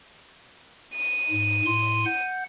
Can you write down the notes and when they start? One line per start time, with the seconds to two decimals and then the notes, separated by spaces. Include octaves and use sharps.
0.96 D#7
1.31 G#2
1.66 A2 C6
2.05 F#5 G6